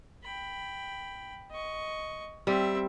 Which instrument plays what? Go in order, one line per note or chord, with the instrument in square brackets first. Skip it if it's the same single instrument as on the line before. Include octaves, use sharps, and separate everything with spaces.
[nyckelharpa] G5 B5
D#5 C#6
[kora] G3 [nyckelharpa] C4 E5